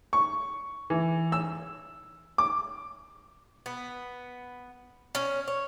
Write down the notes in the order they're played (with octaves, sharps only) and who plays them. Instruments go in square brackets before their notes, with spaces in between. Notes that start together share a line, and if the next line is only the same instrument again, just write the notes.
[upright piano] C#6
E3
E6
D6
[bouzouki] B3
C#4
C#5